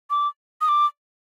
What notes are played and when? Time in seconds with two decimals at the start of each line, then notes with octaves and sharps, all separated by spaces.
0.10 D6
0.61 D#6
0.68 D6